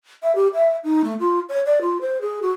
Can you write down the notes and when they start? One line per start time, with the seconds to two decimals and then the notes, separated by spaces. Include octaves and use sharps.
0.23 E5
0.35 G4
0.54 E5
0.84 D#4
1.04 A3
1.20 F4
1.49 C#5
1.66 D5
1.81 F4
2.01 C5
2.21 G#4
2.42 F#4